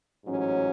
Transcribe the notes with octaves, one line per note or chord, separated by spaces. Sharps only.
A1 G#2 F#3 C#4